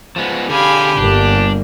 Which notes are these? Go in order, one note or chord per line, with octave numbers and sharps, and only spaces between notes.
F3 G#3 B3
D3 G4 G#4 F5 G#5 B5
G1 A#3 D4